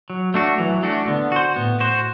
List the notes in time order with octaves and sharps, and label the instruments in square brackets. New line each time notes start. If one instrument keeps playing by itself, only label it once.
[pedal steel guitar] F#3
A3 D4 F#4
[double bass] E3 [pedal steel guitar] F#3
[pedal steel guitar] A3 D4 F#4
[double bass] D3 [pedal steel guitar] B3
[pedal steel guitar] F#4 C5
[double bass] A2 [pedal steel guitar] B3
[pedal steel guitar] F#4 C5